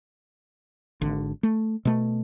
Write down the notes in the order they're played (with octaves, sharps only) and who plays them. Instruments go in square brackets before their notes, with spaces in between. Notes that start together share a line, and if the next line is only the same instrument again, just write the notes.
[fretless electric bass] G#1 D3
A3
B2 A3